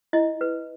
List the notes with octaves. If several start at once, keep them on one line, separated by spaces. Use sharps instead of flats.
E4 D#5
B4